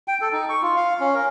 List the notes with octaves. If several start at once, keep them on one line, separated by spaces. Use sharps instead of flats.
G5
A4
D#4
C#6
F4
F5
C#4
A#4